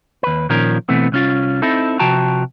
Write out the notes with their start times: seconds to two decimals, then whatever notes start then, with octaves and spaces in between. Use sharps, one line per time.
0.23 D#2 B4
0.50 A#2 D#3 F3 C#4 A#4
0.89 B2 E3 A3 B3 C4
1.12 C2 C#4 F4
1.62 C4 D#4 E4 A4
1.99 C3 F3 F#4 G5 A5 A#5